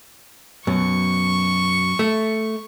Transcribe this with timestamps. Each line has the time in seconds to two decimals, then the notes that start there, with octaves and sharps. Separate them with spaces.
0.67 F#2 B2 C#6
1.99 A3